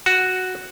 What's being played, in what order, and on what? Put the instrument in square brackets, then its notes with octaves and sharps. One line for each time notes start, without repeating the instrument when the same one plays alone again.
[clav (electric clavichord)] F#4